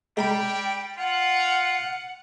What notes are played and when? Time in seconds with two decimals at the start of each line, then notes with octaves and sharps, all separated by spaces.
0.17 G3 G#3 G5 A#5 B5
0.98 F4 F#5